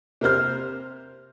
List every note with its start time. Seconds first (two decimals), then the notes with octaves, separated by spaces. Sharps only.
0.21 C3 A#4 C5 F6